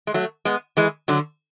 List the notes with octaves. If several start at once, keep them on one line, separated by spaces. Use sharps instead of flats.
G#3
F#3 A3
G#3 B3
E3 G#3
D3 F#3